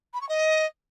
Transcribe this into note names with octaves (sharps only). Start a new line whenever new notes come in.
B5
C#6
D#5